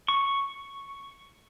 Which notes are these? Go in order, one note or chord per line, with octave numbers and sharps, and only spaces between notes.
C#6